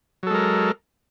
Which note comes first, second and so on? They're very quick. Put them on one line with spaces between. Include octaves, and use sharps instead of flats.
F#3 A4 G#3 A#4